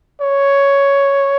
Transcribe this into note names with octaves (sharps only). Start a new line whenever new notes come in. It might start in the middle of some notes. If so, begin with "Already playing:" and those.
C#5